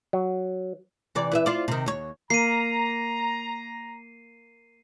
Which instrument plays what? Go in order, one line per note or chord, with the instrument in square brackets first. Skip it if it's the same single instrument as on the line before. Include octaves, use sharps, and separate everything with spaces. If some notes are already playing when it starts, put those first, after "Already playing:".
[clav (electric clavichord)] F#3
[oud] C3 E3 D5
E3 B4 E5
F4 C5 D5
C3 D#3
D#2 C#5
[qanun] A#3 [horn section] A#5 [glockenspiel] C7 D#7